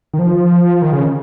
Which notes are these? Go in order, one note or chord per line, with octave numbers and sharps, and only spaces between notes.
D#3
F3
D#3
C#3